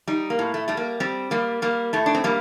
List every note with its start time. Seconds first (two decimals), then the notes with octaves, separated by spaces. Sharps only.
0.07 G3 D#4
0.30 A#3
0.39 A2
0.54 A3
0.68 G3 A3
0.77 A#3
1.00 G3 C4
1.31 G3 A#3
1.62 G3 A#3
1.93 A2 A3
2.06 D4
2.15 C4
2.24 G3 A#3